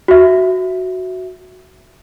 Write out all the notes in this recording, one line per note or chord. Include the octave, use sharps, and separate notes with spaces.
F#4 E5